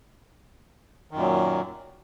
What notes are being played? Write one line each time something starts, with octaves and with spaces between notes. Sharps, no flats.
F#2 A#2 D#3 F#3